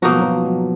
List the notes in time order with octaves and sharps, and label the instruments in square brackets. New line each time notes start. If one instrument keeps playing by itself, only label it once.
[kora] B2 A#3 D#4 F#4 [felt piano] F3
[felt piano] F#3
F3
F#3